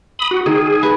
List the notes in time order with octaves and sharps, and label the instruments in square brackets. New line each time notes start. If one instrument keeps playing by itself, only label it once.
[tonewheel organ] B5 D#6
F#4
[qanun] D#3 [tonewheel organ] G#4
[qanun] B4 G#5